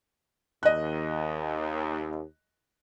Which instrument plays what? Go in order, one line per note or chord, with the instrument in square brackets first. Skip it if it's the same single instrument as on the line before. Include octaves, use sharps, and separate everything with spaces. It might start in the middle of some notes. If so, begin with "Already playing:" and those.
[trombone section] D#2 [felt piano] D#5 F#6